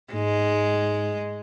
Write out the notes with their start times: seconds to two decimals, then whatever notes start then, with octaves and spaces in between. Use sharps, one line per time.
0.13 G#2 G#3